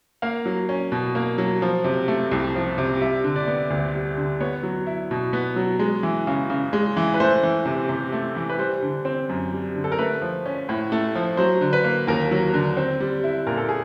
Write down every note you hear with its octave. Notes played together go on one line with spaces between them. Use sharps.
A#3 F5
F#3
C#4
B2
A#3
F#3
F3
C3
A3
C2
F3
C3
G3 E5
D3
D5
B3
D2
G3
D3
B3 C#5
F#3
E4
B2
B3
F#3
G#3
E3
C#3
C#3
G#3
E3
B4
A3 C5
E3
C3
C3
A3
E3
B4
G3 C5
D3
C4
F#2
G3
D3
A4
A#4
A3 B4
F3
C#4
A2
A3
F3
F#3 C5
D3
B4
A#3
D#2 A#4
F#3
D3
C4
G3
E4
A#2 A#4
A4
G#4